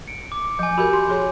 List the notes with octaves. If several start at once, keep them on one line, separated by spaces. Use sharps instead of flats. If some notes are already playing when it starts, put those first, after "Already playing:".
C#7 D7
D6
F3 G#5 G6
F#4 G4 A#4 B5 G6
C6
G#4 C#5 C6